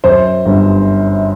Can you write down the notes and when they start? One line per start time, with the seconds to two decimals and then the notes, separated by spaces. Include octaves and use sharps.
0.04 F#2 C5
0.46 G1